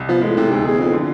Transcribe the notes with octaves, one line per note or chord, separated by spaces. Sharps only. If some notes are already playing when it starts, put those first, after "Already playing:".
Already playing: C2
F3 B3
A2 G#3
A2 C3
D2 G#2
E2 G#4
F2 B3
D3